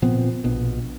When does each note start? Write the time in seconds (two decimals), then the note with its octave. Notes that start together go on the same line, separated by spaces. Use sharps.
0.02 A#2 F3 B3 C4
0.44 A#1 B2